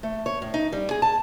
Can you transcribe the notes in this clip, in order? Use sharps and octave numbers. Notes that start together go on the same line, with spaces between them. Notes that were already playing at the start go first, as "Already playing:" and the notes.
A3
C#5
A2
D#4
G3
G#4
A5